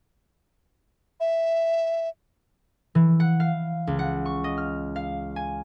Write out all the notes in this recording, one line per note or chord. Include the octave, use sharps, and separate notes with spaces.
E5
E3
F#5
F5
C#2
F#5
C#6
D#5
F6
F5
G#5